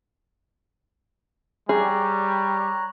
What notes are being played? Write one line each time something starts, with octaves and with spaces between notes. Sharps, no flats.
G3 G#4 C#5 A#5 F#6